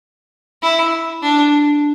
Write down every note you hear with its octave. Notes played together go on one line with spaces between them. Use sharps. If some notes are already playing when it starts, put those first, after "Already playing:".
E4
D4